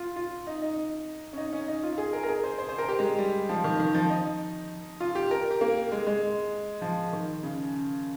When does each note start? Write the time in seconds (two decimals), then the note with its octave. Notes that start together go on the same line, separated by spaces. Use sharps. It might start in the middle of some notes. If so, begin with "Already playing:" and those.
Already playing: F4
0.16 F4
0.47 D#4
0.62 D#4
1.33 C#4
1.37 D#4
1.53 C#4
1.68 D#4
1.83 F4
1.98 G#4
2.13 A#4
2.23 A#4
2.28 G#4
2.44 C5
2.58 C5
2.69 C5
2.78 A#4
2.89 G4
2.99 G#3
3.18 G3
3.49 F3
3.64 D#3
3.79 D#3
3.94 F3
4.10 D#4
5.00 F4
5.15 G4
5.31 A#4
5.51 G4
5.61 A#3
5.92 G#3
6.07 G#3
6.81 F3
7.13 D#3
7.43 C#3